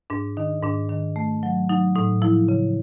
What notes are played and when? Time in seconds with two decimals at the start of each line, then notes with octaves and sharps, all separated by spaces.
0.10 G#2 D4
0.37 D#3 D#4
0.63 G#2 D4
0.89 D#3
1.16 A3
1.43 F#3
1.69 F#3 D#4
1.96 A2 D#4
2.22 F3 E4
2.49 C#3